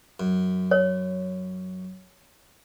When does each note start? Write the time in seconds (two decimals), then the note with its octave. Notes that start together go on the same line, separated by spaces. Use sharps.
0.20 F#2
0.71 C#5